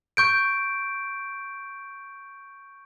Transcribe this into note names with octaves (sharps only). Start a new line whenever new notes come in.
C#6 G6 D7